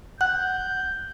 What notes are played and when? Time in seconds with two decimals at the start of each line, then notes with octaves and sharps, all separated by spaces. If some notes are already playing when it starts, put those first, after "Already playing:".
0.21 F#5 F#6 G6